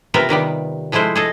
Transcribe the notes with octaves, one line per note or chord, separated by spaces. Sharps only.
C3 B3 F4 A#4 E5
C3 D#3 G3 B3
F3 G#3 A3 E4 C5
G#4 A4 D#5